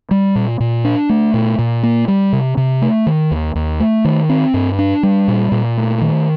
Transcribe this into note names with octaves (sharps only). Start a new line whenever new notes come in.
G3
A#2
A#2
D4
A3
A#2
A#2
A#3
G3
C3
C3
A3
D#3
D#2
D#2
A3
D#3
C4
G2
D4
G3
A#2
A#2
A3
D#3